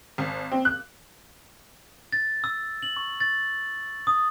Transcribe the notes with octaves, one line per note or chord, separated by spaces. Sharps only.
G#1
C4
F#6
A6
E6
F#7
C#6
A6
D#6